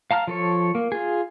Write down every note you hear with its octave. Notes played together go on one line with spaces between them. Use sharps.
F5 A5 A#5 F6
F3 A4 C#5
A#3
F4 G#4